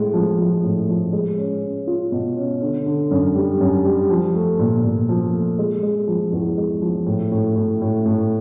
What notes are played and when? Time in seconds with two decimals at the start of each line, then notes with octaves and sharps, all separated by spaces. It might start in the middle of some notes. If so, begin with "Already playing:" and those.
Already playing: A2 G#3
0.14 F3
0.38 F3
0.64 A2
0.89 F3
1.13 G#3
1.38 C#4
1.62 C#4
1.87 F4
2.12 B2
2.37 C#4
2.61 D3
2.86 D3
3.11 F#2
3.35 G3
3.60 F#2
3.84 G3
4.10 F3
4.34 A3
4.59 A#2
4.84 A#2
5.09 F3
5.34 A3
5.59 G#3
5.83 G#3
6.08 F3
6.32 E2
6.57 G#3
6.82 F3
7.06 A2
7.32 A2
7.56 A2
7.81 A2
8.06 A2